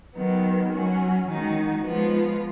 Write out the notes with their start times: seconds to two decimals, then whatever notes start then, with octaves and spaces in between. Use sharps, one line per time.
0.15 D#3 F#3 B3
0.71 F#3 C#4 F#4
1.28 D#3 G#3 D#4 F#4
1.84 F3 G#3 B3 F4